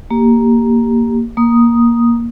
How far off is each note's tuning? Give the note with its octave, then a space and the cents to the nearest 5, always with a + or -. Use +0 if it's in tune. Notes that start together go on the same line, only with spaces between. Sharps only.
A#3 +0 G4 +0
A#3 +10 D#6 +0